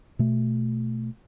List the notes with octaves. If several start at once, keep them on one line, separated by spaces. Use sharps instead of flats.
B2 A3